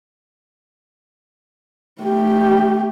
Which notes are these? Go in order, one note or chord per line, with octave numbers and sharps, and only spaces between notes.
A3 G4